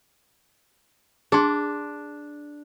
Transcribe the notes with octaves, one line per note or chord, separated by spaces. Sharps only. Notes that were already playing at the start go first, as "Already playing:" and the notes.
D4 G#4 C6